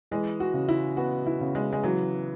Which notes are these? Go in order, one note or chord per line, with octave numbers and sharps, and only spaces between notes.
E3 G#3
F#4
C#3
E4
B3 F#4
E4
C#3
G#3
G#3
E3 F#3